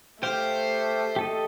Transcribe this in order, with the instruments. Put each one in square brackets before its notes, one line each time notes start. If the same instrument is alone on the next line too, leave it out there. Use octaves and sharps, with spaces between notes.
[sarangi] A3 [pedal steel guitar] G4 F5 G5 [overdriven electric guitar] C5
[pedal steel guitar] G4 A4 D#5